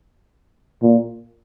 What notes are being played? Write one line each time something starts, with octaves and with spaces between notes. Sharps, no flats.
A#2